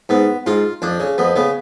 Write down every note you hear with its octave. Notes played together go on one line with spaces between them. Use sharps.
G#2 B3
G#2 F4
F2 D4
C#3
F2 B3
C#3 B3